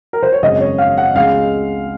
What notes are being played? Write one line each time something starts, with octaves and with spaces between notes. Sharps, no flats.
A#4
C5
C#5
G#1 F#2 C#3 D#5
C#5
F5
F#5
C#2 C#3 G#3 F5